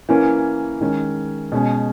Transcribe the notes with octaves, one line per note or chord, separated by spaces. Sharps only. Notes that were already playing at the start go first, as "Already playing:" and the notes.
E3 A#3 C#4
D#3 G#3 C#4
B2 G#3 C#4